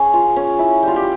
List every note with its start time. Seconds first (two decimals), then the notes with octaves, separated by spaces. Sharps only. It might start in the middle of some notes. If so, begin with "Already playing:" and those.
Already playing: C#4 G#4 A#4
0.13 F4
0.36 C#4
0.59 E4
0.83 G3 F4
0.96 G4